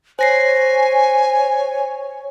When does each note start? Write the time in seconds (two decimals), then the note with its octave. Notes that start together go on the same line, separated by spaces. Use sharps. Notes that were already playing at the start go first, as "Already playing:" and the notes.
0.19 C5 C#5 G#5 A#6 C7